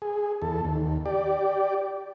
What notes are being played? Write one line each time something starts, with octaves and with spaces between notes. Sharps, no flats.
G#4
E2 A4
D#2
G4 D5